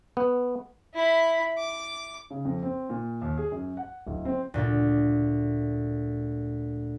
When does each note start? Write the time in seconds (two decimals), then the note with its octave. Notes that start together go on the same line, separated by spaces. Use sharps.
0.17 B3
0.94 E4 B5
1.57 D6
2.30 C#3
2.45 F2
2.63 C4
2.90 A#2
3.22 D#2
3.37 G#4
3.52 F#2
3.77 F#5
4.07 D1
4.25 C4
4.54 D2 A#2